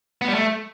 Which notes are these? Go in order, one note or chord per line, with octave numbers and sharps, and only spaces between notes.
B3
G3
A3